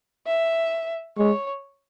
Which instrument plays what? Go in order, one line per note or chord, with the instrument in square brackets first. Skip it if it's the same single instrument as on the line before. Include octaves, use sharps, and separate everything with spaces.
[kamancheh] E5
[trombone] G#3 [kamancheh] C#5